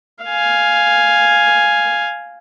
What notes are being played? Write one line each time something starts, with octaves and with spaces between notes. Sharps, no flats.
F5 G#5